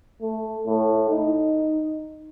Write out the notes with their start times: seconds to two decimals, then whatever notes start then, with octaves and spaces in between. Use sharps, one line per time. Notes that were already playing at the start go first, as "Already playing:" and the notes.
0.22 A3
0.66 A2
1.09 D#4